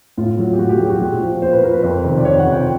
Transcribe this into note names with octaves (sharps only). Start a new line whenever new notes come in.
A2 F4
F#3
G4
A2 F#4
G4
F#3 G#4
G4
F#4
A#2
F3
A#2 C5
B4
F3 A#4
B4
F2
C3 D#3
D5
F2 C#5
F#5
C3 D#3
G5